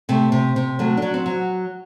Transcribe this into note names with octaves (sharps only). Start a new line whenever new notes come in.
C3 A3
C3
C3
F#3 A3
F#3 D4
C4
F#3